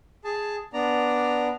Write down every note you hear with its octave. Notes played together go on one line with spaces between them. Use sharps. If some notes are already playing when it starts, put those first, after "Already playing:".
G#4 A5
B3 D4 D5 A#5